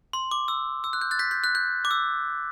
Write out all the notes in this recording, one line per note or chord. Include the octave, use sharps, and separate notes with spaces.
C6
D6
E6
E6
F#6
G6
F#6 A6
G6 B6
G6
F#6
G6
D6
E6